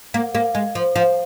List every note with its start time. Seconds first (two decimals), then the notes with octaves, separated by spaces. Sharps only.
0.14 A#3
0.35 A#3
0.55 G#3
0.75 F3
0.96 F3